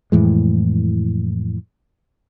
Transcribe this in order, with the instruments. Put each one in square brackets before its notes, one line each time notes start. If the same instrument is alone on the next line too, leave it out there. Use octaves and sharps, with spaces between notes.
[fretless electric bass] F2 A2 E3 G#3